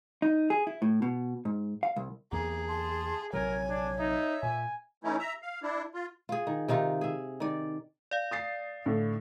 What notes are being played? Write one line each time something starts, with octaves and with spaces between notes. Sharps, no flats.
D#4
G#4
E4
A2
B2
G#2
F5
C2
E2 A#3 G#4 A#5
A5 C6
A#1 C3 F#3 A#4 C#5 G#5
D4
D#4 E5
A#2 G#5
E3 A3 C#4 D#4 E4
E5 A#5
F5
D4 E4
F4
F4 G#4
D#3
C3 D#3 D#4 F4
G#4 E5
D#3 D5
D5 F5
D#6 A6 C7
A2 D3